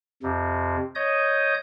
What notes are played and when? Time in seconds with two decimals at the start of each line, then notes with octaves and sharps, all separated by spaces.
0.23 F2 C3
0.95 C#5 D#5 D#6 G6